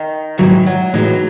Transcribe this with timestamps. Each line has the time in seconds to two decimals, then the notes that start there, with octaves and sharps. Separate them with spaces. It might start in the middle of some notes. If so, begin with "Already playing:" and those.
Already playing: D#3
0.38 G#2 D#3 E3 F#3
0.66 F#3
0.94 A2 E3 F#3 G#3 D#4